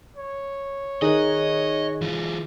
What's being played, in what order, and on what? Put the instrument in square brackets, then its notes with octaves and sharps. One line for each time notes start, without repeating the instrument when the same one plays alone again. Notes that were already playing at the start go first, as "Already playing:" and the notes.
[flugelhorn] C#5
[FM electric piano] D#3 D#4 F#6 [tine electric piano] G#4 [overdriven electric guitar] D#5
[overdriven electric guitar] E3 F4